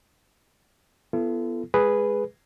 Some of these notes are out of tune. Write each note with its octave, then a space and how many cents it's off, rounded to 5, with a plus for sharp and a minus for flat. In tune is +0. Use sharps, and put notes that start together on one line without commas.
B3 +0 F4 -45 A4 +0
G#3 +0 G#4 -5 B4 +0